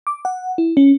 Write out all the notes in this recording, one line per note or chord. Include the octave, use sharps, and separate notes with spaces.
D6
F#5
E4
C#4